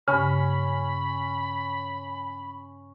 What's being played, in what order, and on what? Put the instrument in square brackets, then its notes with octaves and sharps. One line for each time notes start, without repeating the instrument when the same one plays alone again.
[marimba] G2 C#3 [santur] C#4 [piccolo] B5